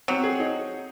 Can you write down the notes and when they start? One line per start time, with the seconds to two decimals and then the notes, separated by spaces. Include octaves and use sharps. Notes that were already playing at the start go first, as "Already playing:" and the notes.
0.08 F#3 C4
0.23 G#4
0.40 D#4